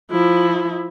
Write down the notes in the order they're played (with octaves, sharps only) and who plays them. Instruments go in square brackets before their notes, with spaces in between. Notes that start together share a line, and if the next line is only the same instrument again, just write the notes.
[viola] F3 E4